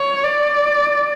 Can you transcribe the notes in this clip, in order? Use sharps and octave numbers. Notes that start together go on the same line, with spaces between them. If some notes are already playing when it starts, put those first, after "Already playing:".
Already playing: C#5
D5